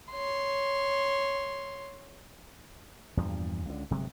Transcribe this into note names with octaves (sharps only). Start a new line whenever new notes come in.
C#5 C6
E2 G2 A#2 F3
C#2 D3
G1 C3 F#3 G#3